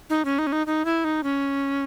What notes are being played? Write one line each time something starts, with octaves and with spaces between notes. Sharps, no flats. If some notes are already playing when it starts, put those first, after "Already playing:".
D#4
C#4
D#4
C#4
D#4
D#4
E4
D#4
C#4